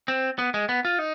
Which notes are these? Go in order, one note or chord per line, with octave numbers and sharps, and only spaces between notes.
C4
B3
G#3
B3
F4
D#4